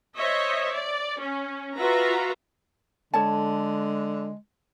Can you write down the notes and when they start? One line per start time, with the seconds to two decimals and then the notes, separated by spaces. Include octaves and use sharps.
0.15 C5 C#5 D#5 E5
0.73 D5
1.18 C#4
1.75 F4 F#4 B4 E5 A#5
3.14 D3 G#3 A4 C#5 A5